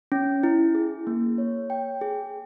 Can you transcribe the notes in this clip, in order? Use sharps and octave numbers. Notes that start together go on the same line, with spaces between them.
C#4
E4
G#4
A#3
C#5
G5
G#4